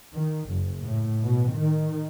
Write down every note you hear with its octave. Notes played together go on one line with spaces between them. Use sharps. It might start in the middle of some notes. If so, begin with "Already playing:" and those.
D#3
F#1
A2
B2
D#3